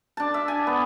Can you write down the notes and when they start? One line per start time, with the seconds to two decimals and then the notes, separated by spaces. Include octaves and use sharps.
0.17 D4 A5
0.34 E5
0.48 G#5
0.67 B3